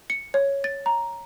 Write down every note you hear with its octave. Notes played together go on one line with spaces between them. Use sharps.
C#7
C#5
A6
A#5